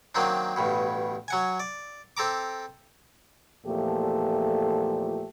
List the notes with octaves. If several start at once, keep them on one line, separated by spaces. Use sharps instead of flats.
D#3 F#3 A#3 C4 D4
A1 G2 B2
F#3 F#5 G#5
D5
C4 A4 A#5 D6
E2 A#2 F3 A3 G4 A4